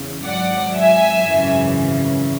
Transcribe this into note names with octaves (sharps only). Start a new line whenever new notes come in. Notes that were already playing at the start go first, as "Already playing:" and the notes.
Already playing: E2 C#3
G#1 G#2 F#3 D5 F#5
E5 G#5
G#1 F#2 C#3 E3